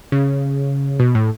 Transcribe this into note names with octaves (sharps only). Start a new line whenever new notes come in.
C#3
B2
A2